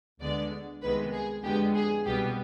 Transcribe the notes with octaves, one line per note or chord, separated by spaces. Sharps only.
D2 D3 G#3 B3 D5
C2 C3 D#3 G#3 B3 B4
G#4
F2 D3 G#3 B3 G4
G#4
C2 B2 G3 B3 G4